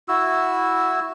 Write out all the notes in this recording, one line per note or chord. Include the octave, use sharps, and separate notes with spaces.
E4 F#4 E6